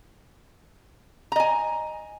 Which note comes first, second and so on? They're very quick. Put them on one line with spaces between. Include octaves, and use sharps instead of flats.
A#5 D#5 G#5